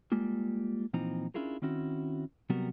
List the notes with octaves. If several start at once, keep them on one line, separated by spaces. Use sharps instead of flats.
G3 G#3 A#3 F4
A#2 E3 F3 C4 D#4 A#5
C#4 D4 E4 F4 G#4 A#4
D#3 C4 C#4 E4 F#4
C3 F#3 G3 B3 F#4 A#4